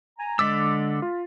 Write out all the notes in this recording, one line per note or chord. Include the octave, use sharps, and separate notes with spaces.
G#5 A#5
D3 G#3 D6 E6 A6 B6
F4